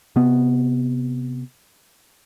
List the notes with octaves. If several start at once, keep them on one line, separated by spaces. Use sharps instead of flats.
C3 B3